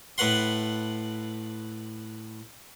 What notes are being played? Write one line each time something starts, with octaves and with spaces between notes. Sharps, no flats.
A2 A3 B4 F#5 C6